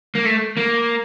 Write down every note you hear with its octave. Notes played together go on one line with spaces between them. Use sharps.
A#3
A3
A#3